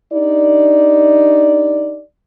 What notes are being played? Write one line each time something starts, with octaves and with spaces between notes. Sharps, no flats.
D4 D#4 G4 D5